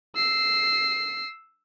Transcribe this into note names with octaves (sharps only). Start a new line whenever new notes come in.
E6 C7